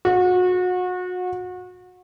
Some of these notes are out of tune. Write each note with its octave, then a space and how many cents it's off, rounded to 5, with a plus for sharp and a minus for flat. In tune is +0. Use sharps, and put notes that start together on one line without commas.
F#4 -30